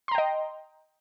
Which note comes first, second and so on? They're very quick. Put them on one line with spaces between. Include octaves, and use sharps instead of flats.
C6 A#5 G5 D#5